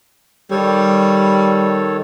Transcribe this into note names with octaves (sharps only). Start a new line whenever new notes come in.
D#3 G3 A4 C#5